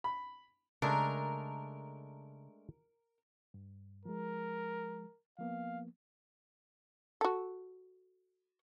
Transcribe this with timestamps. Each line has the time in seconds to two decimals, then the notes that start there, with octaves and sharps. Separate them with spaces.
0.04 B5
0.82 C#3 G#3 A3 D4 A#4
3.54 G2
4.05 F3 G#3 A#4
5.39 F3 A#3 B3 F5
7.21 F#4 A4